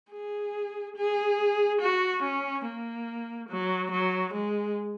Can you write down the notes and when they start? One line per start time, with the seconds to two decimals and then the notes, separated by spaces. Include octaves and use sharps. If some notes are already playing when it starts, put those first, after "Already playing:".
0.12 G#4
0.96 G#4
1.81 F#4
2.23 C#4
2.65 A#3
3.49 F#3
3.91 F#3
4.33 G#3